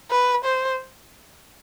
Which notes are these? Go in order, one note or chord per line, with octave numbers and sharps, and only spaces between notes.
B4
C5